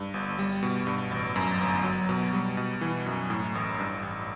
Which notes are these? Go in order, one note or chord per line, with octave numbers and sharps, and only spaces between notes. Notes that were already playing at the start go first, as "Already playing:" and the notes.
Already playing: G2
G1
G3
B2
G2
A1
F#2
G1
F#3
B2
G3
B2
E3
F#2
A2
A1
G2
A1